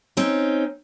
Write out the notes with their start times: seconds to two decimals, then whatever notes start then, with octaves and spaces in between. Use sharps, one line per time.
0.17 C4 C#4 D#4